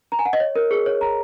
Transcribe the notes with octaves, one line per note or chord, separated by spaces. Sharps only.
A#5
G#5
F#5
D#5
C#5
A#4
G#4
C#5
A#5